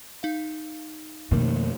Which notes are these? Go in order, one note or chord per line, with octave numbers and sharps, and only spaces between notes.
D#4 F5
F2 B2 D#3 A3 A#3 D#4